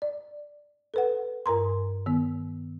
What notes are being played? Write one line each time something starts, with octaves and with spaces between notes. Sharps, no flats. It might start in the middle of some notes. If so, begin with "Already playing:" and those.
D5
A4 B4 F#5
G2 A#4 A#5 C6
D#3 B3